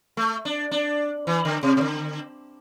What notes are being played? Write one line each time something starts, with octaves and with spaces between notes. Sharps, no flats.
A3
D4
D4
E3
D3
C3
C3
D3